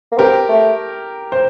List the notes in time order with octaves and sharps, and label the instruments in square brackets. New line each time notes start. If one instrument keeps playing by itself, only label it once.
[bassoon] A#3
[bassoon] C4 [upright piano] G4 A#4
[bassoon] A3
[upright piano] C5